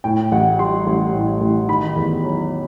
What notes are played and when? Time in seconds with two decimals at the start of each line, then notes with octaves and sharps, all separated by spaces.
0.04 A2 G5
0.32 A1 F#5
0.59 G3 C6
0.87 A1
1.14 A2
1.41 A1
1.68 D#3 B5
1.96 E2
2.23 F#3